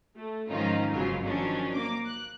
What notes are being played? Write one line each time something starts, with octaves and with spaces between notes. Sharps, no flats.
A3
G#2 D#3 F3 C#4 D#4 F4
G1 C#2 G#2 C#3 F#3 F4
D#3 F3 F#3 C#4 D4
A#3 D6
F#6